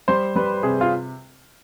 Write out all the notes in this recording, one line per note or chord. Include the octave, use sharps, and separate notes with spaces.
G3 C5
G3 B4
C3 G#4
F4